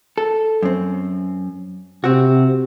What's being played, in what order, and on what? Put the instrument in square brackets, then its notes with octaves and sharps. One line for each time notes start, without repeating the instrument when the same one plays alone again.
[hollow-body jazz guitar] A4
F#2 C4
[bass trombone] C3 [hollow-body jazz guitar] C4 F#4